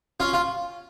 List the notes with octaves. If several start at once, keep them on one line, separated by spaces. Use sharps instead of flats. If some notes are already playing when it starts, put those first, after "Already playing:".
C#4 F4
F4